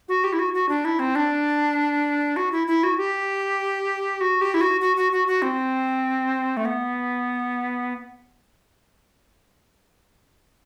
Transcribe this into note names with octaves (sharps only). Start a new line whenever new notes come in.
F#4
G4
E4
F#4
F#4
D4
E4
C4
D4
F#4
E4
E4
F#4
G4
F#4
G4
E4
F#4
F#4
F#4
F#4
F#4
C4
A3
B3